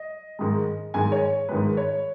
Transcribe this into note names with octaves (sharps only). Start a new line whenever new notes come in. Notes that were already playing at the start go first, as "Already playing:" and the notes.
Already playing: D#5
G#2 D#3 G#3
G#2 D#3 G#3 G#5
C#5
G#2 D#3 G#3 B4
C#5